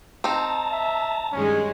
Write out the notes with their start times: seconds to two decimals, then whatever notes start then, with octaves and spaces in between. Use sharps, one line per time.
0.24 C4 D#4 A5 A#5
0.72 E5
1.32 G2 D#3 G#3 C#4